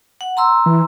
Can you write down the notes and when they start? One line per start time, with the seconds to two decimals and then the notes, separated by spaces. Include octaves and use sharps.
0.21 F#5
0.37 A#5 C6 E6
0.66 E3